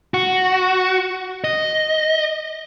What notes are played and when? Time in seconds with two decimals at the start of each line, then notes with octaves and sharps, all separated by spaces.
0.14 F#4
1.44 D#5